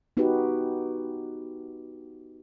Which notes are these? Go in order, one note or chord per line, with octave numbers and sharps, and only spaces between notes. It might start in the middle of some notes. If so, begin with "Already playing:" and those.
B3 D#4 F#4 G4 B4